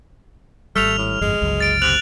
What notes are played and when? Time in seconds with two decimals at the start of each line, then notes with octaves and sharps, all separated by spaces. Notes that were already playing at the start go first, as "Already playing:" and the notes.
0.76 G#1 G3 A3 F6 F7
0.98 A2
1.21 G1 F2 G#2 G#3
1.41 G1 C#2 F#3
1.60 A6 D7
1.82 C3 F#6 F7 F#7